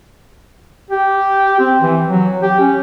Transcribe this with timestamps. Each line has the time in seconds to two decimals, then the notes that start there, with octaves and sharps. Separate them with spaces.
0.91 G4
1.60 C4
1.81 E3
2.07 F#3
2.43 G4
2.60 C#4